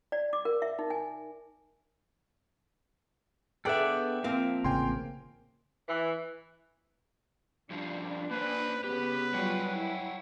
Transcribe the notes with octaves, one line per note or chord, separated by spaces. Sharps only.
D5
D6
A#4
E5
D#4
G#5
D3 B3 G#4 A4 D5 E5 F#5 G5
F3 A#3 C4 F5
A1 C#3 G5 G#5 C6
E3
G2 F3 D4 F4
A#3 B4 C5
C#3 B3 G4 B4
F#3 G3 F4 C#5 F#5 G5
E4